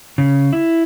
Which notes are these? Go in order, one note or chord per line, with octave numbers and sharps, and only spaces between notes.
C#3
E4